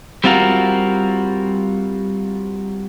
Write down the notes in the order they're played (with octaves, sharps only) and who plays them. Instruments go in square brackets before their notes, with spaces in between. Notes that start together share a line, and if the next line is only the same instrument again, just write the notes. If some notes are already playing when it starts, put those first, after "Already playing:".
[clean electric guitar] G3 C4 F4 F#4 A#4